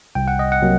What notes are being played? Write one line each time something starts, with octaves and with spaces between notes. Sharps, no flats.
C2 G5
F#5
D#5
F#5
C3 F#3 A#3